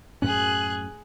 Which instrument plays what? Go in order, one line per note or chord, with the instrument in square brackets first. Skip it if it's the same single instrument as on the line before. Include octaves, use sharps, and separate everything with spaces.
[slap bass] F#2 A2 C#4 [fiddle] G#4 F#6